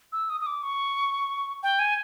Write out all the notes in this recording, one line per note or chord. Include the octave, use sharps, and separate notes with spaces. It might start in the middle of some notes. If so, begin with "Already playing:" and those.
E6
D#6
D#6
D6
C#6
G5
G#5